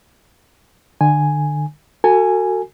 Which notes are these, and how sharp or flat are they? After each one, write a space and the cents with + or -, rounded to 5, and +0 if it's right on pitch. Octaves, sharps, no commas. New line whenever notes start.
D3 +30 G#5 +0
F#4 +0 A4 +35 G#5 +0